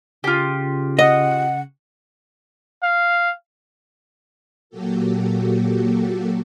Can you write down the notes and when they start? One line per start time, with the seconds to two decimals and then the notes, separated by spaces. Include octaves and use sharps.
0.24 C#3 F4 G4
0.99 D#5 F#5
2.83 F5
4.70 A#2 F#3 A#3 F#4 G4 A4